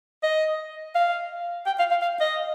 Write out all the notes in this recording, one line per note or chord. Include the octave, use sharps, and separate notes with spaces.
D#5
F5
G5
F5
F5
F5
D#5